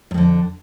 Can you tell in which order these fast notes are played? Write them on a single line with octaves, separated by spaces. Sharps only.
G#2 F2 D3